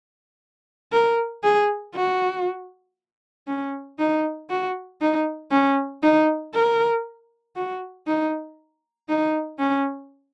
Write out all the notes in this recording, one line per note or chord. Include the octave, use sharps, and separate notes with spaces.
A#4
G#4
F#4
C#4
D#4
F#4
D#4
C#4
D#4
A#4
F#4
D#4
D#4
C#4